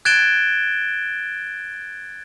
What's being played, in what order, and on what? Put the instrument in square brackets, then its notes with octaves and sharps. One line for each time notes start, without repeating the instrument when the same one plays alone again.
[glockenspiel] F#6 G#6 A6 D7 E7 G7